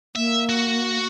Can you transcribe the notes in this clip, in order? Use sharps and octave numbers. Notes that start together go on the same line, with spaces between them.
A#3 E5
F#4